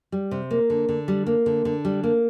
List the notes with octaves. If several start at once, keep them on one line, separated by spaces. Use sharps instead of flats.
G3
C3
A#3
D3
D3
G3
A#3
D3
D3
G3
A#3